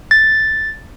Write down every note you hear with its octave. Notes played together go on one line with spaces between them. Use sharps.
A6